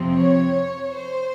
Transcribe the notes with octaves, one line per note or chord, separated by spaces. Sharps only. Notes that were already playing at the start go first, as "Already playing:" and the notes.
Already playing: F2 C3 F3 C4
C#5
C5